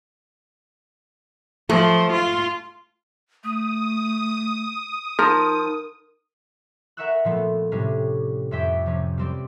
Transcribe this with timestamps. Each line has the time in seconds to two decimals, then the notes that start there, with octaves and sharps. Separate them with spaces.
1.70 F3 A3
2.13 F4
3.44 A3 D#6
5.19 F3 D#4 A#4
6.97 A#4 E5 F#5 C#6 E6 F#6
7.25 A#2 F3 A3 B3
7.72 A2 C3 G3 C#4 D4
8.51 F2 C#4 E5 G5 D6 B6
8.86 C3 F3 C#4
9.18 G3 C4 D5